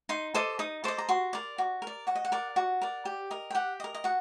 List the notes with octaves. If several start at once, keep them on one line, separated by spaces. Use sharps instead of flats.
D#4 C6
A4 C5 D#5 D6
D#4 D#6
A4 C5 D#5 D6
A#5
F#4 C6
A#4 D5
F#4
A#4
D5
F#4 F#5
D#5
F#5
A#4 D5
F#4 F#5
A#4 D5
G4
A#4 D#5
G5
G4 F#5
A#4 D#5
D#5
F#4 F#5